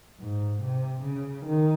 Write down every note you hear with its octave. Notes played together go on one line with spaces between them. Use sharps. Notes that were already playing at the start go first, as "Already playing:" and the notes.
G#2
C3
C#3
D#3